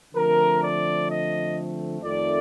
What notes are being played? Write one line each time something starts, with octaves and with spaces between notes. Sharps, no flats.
D3 F3 A3 C4 A#4
D5
D#5
F2 D#3 A3 D5